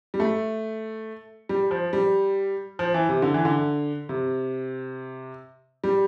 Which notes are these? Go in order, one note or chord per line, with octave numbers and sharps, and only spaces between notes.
G3
A3
G3
F3
G3
F3
E3
C3
D3
E3
D3
C3
G3